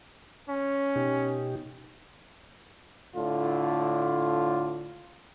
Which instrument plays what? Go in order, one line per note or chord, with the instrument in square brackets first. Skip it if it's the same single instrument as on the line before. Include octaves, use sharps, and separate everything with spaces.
[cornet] C#4
[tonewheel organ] B2 D#4 G4
[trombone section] A2 D3 F4